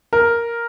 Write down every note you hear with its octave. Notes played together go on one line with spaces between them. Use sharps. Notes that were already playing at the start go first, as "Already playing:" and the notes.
A#4